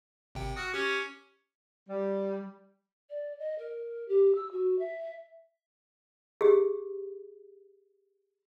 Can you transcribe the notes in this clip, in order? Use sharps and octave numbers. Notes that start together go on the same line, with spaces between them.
G#1 C3 G5
F#4 D#6 F6
C#4 G4
G3
D5
D#5
A#4
G4
E6
F#4
E5
G4 G#4